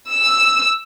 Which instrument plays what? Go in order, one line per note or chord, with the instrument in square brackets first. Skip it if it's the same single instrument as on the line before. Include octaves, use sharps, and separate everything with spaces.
[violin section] E6